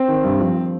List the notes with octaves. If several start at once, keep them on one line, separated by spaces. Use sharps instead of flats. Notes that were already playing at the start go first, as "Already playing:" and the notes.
Already playing: C4
D#3
G2
F3